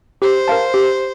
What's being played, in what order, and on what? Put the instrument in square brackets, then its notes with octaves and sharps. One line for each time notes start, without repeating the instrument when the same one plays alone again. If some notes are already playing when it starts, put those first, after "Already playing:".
[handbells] G4 [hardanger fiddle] C5
[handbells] A#4 F5 A5
G4